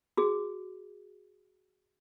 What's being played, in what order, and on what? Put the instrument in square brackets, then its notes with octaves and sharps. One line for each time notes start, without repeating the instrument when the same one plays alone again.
[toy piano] F#4 G#4